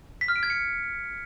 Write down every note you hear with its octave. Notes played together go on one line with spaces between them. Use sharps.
B6
F6
D7
G#6
C#7